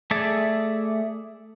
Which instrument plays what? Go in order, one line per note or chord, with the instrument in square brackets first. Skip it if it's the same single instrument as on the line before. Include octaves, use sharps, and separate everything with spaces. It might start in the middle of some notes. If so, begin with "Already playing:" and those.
[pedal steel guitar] A3 G#4 D5 E5 A5